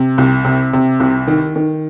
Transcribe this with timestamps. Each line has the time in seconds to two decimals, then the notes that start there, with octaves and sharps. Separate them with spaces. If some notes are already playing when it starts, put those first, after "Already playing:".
Already playing: C3
0.18 C2
0.45 C3
0.73 C3
1.00 C2
1.27 D#3
1.56 D#3